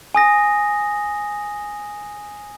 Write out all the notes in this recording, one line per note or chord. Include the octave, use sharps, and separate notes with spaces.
G#5 D#6 A#6